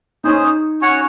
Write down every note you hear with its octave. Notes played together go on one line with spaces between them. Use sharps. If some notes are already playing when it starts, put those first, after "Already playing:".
C#4 D#4 G#4 C5
C#4 F#4 C#5 F#5